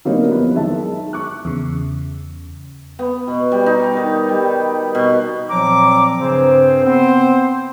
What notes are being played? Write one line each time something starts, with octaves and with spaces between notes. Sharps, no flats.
D3 F#3 G3 A#3 B3 D#4
F2 B3 E4
B1 D#3 G#3 E5 A5
C#6 D6 F#6
E2 C#3
B3
B2
G3
D#4
D#3
G3
B2
A#2 F3 F#3 C4 A#5 D6
G2 C#3 C4 C5
B3 C4 C5